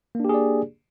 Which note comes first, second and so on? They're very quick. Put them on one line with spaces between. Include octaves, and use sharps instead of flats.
A#3 D4 G4 G#4 D5